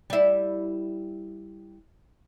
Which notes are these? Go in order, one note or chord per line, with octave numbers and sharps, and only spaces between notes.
G3 E4